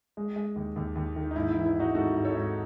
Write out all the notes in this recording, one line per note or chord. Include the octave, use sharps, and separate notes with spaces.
G#3
G#3
D#2
D#2
D#2
D#3
D#4
G#2 E4
E4
E3
E4
G#2 D#4 F#4
G#2 F#4 A4
G#2
A4 C#5
G#2